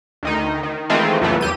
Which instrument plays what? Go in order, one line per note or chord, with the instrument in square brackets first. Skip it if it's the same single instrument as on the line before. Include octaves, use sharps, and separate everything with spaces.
[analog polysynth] D2 D#3 D#4
D#3
D#3 E3 G#3 A3 C4 F4
C#2 F#2 A#2 E3 A3 B3
E2 G4 D#7